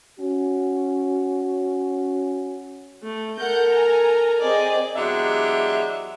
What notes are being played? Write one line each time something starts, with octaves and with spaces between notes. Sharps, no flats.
C#4 F#4
A3
A4 A#4 F#5 G6
G#5 A#5
C4 G#4 D5 D#5
E2 F#3 G#3 D4 G4 E5